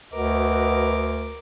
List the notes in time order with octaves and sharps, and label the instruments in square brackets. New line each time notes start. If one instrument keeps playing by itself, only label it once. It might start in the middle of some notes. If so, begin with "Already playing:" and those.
[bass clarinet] D2 [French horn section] F#4 B4 D#5 [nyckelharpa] A#4 D6